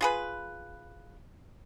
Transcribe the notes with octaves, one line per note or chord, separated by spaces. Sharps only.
F4 G#4 B4